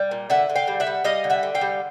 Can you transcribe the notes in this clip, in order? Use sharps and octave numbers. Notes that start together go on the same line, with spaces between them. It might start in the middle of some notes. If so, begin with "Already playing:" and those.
Already playing: G3
A#2
D3 E5 F#5
D3
F5 G5
G3
E5 F#5
G3
G3 D#5 F5
D3
E5 F#5
D3
F5 G5
G3